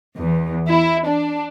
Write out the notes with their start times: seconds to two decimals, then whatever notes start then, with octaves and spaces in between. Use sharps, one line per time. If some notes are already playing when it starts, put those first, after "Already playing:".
0.16 E2
0.68 E4
1.07 D4